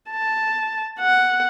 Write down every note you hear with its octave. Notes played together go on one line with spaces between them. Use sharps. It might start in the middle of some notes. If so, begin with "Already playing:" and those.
A5
F#5